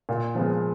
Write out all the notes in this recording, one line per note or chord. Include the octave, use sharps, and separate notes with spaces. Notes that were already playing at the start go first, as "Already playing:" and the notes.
A#2
F3 G#3 B3